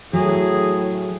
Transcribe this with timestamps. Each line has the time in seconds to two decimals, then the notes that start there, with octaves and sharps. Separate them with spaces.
0.13 A2 F#3 G#4